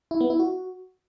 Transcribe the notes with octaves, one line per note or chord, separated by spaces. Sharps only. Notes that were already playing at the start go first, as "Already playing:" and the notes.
E4
B3
E4
F#4